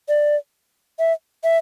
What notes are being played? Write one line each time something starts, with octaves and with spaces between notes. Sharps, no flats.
D5
E5
E5